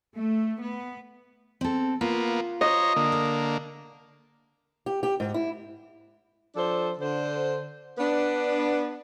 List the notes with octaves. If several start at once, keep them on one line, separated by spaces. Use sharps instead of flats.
A3
B3
C4 A4
A#3 B3 F4
C5 C#5 D#5 A#5
D3 A#3
A#4
G4
G4
G#2
E4
F3 D4 A4 C5
D3 C5
B3 D4